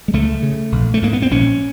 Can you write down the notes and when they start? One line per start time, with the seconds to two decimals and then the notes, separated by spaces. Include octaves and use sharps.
0.08 G#3
0.13 C#2 A3
0.43 C#3
0.72 A#1
0.94 A3
1.02 G#2 A#3
1.13 B3
1.22 C4
1.31 A#1 C#4